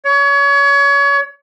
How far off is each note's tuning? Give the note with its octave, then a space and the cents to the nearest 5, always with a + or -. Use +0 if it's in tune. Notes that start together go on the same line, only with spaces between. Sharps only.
C#5 +30